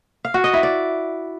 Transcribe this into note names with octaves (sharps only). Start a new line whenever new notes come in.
F5
F#4
D#5
E4
D5